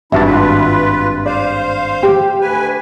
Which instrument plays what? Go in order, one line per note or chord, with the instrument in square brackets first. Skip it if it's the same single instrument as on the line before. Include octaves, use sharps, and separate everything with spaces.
[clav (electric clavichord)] G#1 G2 A5 [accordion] E3 D4 E4 [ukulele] F#4 E5
[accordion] F4 B4
[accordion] C5 F5 [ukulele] D5
[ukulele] G4
[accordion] D2 B4 G#5